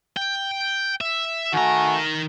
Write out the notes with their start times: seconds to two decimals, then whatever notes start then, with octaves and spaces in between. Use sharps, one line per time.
0.17 G5
1.01 E5
1.53 D#3 A3 F#4 G#5 A#5